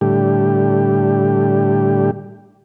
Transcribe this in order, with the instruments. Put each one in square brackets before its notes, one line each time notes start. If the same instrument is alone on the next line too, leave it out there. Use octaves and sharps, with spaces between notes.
[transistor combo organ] A2 D3 G3 G4